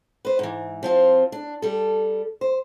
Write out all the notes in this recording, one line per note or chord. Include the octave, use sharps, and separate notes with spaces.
B4 C5
G#2 E3
F3 C4 F4
D4
G3 A4
C5